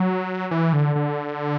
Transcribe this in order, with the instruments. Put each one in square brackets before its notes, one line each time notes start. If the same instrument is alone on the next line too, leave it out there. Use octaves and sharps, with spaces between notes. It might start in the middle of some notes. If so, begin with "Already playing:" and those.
Already playing: [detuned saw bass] F#3
E3
D3
D3